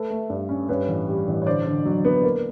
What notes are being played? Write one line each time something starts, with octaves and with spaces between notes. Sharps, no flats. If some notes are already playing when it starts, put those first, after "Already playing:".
Already playing: A3 A4 B4
A3
G2
C#4
G2 B4 C#5
A1
G3
A1
C#5
D3 C5 D5
D3
F#3
B3
A#3